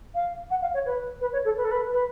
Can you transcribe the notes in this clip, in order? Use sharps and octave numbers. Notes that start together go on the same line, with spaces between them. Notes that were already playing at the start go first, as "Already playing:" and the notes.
F5
F#5
F5
C#5
B4
B4
C#5
A4
B4
A4
B4
B4